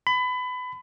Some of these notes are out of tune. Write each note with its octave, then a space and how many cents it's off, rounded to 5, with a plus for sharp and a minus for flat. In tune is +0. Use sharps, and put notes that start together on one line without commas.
B5 +25